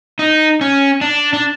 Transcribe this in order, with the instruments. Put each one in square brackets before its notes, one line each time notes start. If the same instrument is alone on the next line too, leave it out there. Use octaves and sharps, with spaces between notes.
[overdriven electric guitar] D#4
C#4
D4
D4